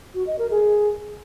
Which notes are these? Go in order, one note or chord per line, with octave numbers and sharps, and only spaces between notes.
F#4
D#5
A#4
G#4